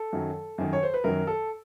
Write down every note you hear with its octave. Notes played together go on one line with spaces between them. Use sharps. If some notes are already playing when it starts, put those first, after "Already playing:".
Already playing: A4
F#2 D#3 F#3
F#2 D#3 F#3
C#5
C5
B4
F#2 D#3 F#3 A#4
A4